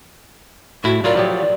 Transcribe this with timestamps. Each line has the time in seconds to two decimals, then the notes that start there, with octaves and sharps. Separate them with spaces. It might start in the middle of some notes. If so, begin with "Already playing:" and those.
0.84 A2 E4 F#4
1.04 F#3 F4 A#4 D5
1.16 F3 F#3 G4